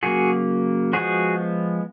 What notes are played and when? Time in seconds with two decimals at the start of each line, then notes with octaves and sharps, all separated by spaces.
0.03 C#3 F#3 A#3 F#4 G#4
0.93 F3 G#3 B3 F#4 G#4